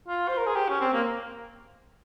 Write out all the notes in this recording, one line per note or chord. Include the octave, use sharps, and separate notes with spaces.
F4
C5
A#4
G#4
G4
C#4
C4
A#3